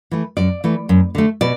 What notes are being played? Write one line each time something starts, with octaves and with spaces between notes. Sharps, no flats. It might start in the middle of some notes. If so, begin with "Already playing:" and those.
E3 A3
F#2 D5
E3 A3
F#2
D3 A3
B2 D5